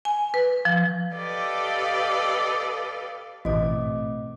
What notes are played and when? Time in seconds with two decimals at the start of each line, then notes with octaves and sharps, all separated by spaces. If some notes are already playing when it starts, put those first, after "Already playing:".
0.05 G#5
0.34 B4
0.65 F3
1.15 G4 A4 B4 D5 D#5 F5
3.45 A1 G#2 B2 E3 A3 C4 D#5 D6